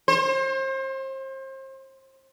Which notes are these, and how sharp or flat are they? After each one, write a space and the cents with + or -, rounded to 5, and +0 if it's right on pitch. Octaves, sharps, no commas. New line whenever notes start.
C5 +35